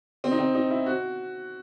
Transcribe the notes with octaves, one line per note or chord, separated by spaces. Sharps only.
C4
D#4
C4
D#4
E4
F#4